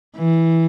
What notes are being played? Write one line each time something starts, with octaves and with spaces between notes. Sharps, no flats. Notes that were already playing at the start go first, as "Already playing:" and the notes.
E3